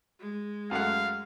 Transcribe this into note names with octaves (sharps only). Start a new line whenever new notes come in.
G#3
F#2 A3 F5 F#5